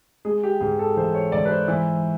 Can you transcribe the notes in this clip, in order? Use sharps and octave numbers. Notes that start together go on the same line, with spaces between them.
G#3 G#4
G4
G#2 G#4
A4
E3 C5
C#5
G#2 D5
B4
C5
E3